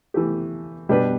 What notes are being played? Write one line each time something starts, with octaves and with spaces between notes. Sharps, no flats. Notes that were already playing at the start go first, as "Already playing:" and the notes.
E3 A3 G4
B2 G3 D4 G4 B4